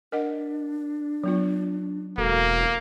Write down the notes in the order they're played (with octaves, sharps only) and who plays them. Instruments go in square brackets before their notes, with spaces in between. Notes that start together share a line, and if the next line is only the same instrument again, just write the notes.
[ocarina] D4 [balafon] A#4 D#5 F#5
[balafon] F#3 B3 F4
[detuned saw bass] E1 [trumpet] A#3 [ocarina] F#4 [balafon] A4